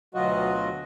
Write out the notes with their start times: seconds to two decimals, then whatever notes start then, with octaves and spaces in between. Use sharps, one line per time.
0.14 D2 B2 F#3 F4 F#4 D#5